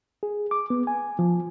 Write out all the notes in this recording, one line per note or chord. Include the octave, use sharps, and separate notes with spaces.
G#4
D6
B3
G#5
F3